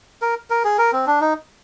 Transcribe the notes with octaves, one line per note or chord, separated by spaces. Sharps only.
A#4
A#4
G#4
A#4
C4
D4
D#4